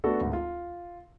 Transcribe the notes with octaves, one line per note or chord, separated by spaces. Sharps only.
A3 B3 D4 F#4 A4
G#1 D2
F4